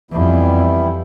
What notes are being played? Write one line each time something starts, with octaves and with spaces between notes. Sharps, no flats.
F2 E3 G3 B3 E4